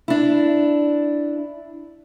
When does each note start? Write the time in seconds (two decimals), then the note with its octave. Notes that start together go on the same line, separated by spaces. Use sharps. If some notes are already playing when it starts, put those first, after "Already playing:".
0.08 D4 E4